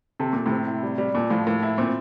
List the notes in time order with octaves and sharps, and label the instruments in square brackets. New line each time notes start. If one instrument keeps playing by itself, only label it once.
[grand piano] C3 [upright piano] A4
[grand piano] A#2 [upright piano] A4
[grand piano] A2 C3
[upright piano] C4
E4
G3
G3
[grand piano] A#2 [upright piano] A3
[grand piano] A2 [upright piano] F3
[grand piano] A2 [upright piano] A#3
[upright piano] E4
[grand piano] A#2 [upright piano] C4